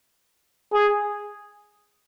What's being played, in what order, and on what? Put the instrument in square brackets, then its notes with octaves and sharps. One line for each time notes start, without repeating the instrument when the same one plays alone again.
[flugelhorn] G#4